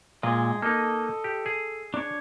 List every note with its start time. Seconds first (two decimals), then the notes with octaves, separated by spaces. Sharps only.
0.23 A#2 G#3 D#5
0.62 A#3 D#4 A4 D#5
1.24 G4
1.46 G#4
1.94 D4 C#5